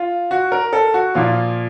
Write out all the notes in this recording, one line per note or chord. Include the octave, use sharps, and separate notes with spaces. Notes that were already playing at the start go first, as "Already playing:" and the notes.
Already playing: F4
F#4
A#4
A4
F#4
A#2 F3 A#3 F4